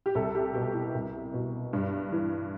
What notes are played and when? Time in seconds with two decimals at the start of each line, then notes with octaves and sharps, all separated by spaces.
0.06 G4
0.15 C2 A4
0.35 G4
0.54 B2 G4
0.74 E4
0.94 C2
1.33 B2
1.73 G2
2.12 E3